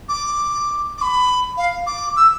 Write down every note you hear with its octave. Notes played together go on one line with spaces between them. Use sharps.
D6
D6
B5
F5
D6
E6